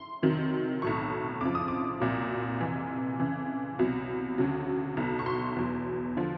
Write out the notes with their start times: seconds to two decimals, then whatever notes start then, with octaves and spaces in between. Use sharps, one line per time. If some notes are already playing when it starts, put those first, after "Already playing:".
Already playing: C6
0.23 F2 C3 D#3 F#3
0.82 B1 A2 F#3 C#6
1.41 F2 C#3 F3 D6
1.55 D#6
1.68 D6
2.00 C2 A#2 F#3
2.61 F2 C3 E3
3.19 F2 C#3 E3
3.79 C2 B2 F#3
4.38 D2 C#3 F#3
4.97 B1 B2 F#3
5.19 C#6
5.26 C6
5.56 E2 B2 F#3
6.17 D3 F3